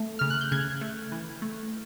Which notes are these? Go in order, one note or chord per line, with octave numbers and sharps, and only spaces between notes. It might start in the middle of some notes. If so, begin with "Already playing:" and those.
Already playing: A3
C#3 F6
F#6
G6
C#3 F#6 G#6
A3
E3
A3